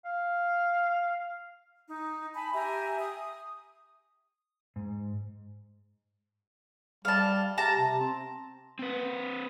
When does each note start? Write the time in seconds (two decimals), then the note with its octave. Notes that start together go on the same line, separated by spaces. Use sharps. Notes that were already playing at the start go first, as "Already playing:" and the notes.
0.05 F5
1.86 D#4
2.33 G#5 A5 B5
2.53 G4 E5 G#5 A#5
2.98 D#6
4.76 G#2
7.05 G3 F5 A5
7.58 G4 A5 A#5
7.77 C3
8.01 C4
8.79 C4 B4